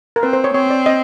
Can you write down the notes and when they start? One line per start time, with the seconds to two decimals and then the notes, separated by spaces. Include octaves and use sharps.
0.16 A#4
0.23 C4 B4
0.33 C5
0.44 C#5
0.54 C4 C#5
0.70 D5
0.86 D#5